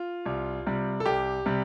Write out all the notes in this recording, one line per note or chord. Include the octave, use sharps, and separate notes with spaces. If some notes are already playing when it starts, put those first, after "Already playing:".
Already playing: F4
C2
C3 G3
A4
C2 G4
C3 G3